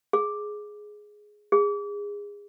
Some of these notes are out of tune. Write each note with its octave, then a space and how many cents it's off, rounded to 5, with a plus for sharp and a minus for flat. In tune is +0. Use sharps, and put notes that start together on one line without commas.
G#4 +10
G#4 -25